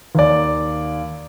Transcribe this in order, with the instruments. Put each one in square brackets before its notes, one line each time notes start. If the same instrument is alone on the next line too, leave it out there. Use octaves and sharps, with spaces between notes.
[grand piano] D#2 D5